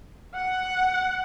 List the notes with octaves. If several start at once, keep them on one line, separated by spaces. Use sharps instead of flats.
F#5